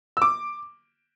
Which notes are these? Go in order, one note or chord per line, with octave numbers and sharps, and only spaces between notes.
E6
D6